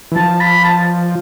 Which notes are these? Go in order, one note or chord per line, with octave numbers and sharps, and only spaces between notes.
E3
F3 A5
B5
A5